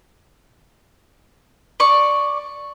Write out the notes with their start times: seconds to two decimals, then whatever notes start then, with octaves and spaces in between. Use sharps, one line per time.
1.80 D5 C#6